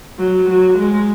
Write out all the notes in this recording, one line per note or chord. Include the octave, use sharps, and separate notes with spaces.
F#3
F#3
G#3